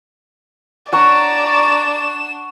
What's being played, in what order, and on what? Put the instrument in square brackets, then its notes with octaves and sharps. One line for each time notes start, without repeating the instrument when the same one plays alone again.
[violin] D4 E7 [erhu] D5 [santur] F#5 C#6 [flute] A#5